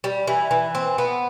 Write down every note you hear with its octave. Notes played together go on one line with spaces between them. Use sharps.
G3
E3
E3
C4
B3